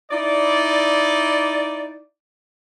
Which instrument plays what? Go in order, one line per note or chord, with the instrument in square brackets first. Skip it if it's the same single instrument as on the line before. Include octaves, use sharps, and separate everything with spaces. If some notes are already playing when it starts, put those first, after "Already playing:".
[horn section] D#4 E4 D5